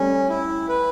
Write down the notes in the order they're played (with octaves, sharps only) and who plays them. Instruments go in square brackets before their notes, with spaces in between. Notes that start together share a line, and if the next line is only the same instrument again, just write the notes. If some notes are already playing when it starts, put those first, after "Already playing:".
Already playing: [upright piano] G3 A3 [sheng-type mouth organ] C#4
[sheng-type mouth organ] E4
B4